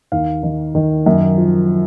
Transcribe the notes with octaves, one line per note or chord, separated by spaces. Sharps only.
D#2 F5
D#3
D#3
F#2
F3